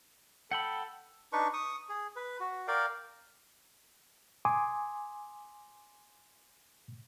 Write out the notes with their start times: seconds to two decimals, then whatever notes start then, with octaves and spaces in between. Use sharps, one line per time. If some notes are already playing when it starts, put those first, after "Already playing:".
0.51 A4 F#5 G5 B5
1.33 D4 D#4 B4 C#6
1.53 C#6 D#6
1.89 G#4
2.16 B4
2.40 F#4
2.68 A#4 D5 F5 G5
4.45 G#5 C6 D6 D#6